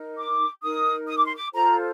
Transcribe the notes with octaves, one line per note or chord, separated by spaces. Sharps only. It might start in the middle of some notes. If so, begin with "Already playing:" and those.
Already playing: D#4 A#4
D6
D#4 A#4 D#6
D#6
D6
C6
D6
F4 A4 C5 A#5